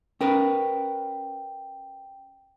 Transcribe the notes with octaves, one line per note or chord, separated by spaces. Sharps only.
C#4 A#4 B4 G5